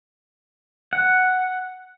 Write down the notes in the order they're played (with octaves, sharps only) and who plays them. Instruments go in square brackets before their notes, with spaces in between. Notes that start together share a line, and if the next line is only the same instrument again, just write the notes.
[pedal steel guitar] F#5